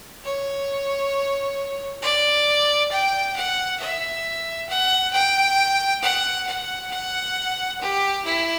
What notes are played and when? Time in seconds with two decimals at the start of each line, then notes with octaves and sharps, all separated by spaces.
0.25 C#5
2.02 D5
2.91 G5
3.36 F#5
3.80 E5
4.69 F#5
5.13 G5
6.02 F#5
6.47 F#5
6.91 F#5
7.81 G4
8.25 E4